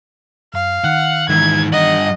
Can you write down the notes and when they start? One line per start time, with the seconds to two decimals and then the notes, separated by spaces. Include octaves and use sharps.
0.54 F#2 F5
0.84 D#3 F#5
1.29 G#2 D#3 E3 E4 G#6
1.72 G2 D#5 F#5